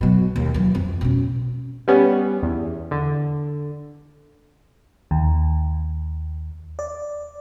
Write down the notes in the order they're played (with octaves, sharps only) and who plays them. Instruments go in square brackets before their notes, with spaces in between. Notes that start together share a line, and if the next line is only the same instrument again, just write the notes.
[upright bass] B2 F#3
D#2 A#3
E3 F#3
F2
B2 C#4
[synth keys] G3 B3 C#4
E2
D3
[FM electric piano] D#2
D5